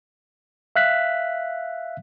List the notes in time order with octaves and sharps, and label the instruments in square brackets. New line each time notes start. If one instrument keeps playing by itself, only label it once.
[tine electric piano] E5 F5 F#6 B6